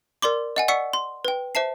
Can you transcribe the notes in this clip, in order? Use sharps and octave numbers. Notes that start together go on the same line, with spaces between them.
A#4 D5 C6 D6
D#5 F#5 G#5
D5 F#5 C#6 E6 B6 C#7
C6
B4 G5
C5 E5 A5 C7